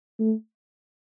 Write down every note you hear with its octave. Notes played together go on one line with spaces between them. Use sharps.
A3